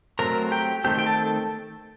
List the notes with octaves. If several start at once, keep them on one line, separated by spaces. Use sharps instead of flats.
F#3 A3 C4 A#4 A#5
G4 G5
D#3 A3 C4 G4 G5
G5
A4 A5